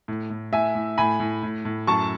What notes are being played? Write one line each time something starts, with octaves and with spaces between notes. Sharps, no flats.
A2
A2
A2 E5 G#5
A2
A2 G#5 B5
A2
A2
A2
F#2 A5 C#6